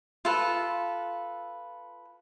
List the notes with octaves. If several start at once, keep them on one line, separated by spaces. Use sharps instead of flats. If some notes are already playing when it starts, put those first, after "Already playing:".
F4 A4 B4